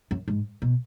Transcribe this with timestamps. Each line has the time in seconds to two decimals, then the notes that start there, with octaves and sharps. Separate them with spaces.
0.11 F#2
0.28 G#2
0.62 B2